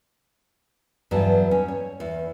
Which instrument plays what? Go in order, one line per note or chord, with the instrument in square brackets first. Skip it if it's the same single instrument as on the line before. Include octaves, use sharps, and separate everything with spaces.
[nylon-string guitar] E2 G2 F#3 A5
C#4
C#5
E2